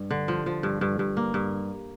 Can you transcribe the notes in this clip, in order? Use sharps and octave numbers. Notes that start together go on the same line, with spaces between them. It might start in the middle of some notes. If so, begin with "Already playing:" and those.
Already playing: G2
D3
F3
F3
G2
G2
G2
A#3
G2